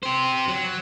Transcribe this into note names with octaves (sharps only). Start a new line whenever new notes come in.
G4 C5
F#3